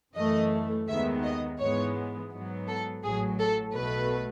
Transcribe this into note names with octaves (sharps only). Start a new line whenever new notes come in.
F#2 E3 A3 D#5
D#2 D#3 G#3 B3 E5
D#5
G#2 E3 G#3 B3 C#5
G#2 F#3 B3
A4
A1 A2 F#3 G#4
A4
B1 B2 A3 B4